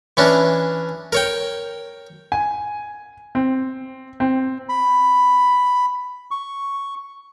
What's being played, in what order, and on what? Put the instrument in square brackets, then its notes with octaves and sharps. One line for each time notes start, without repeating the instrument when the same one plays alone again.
[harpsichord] E3 C#4 D4
A#4 C#5 G5
[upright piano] G#5
C4
C4
[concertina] B5
C#6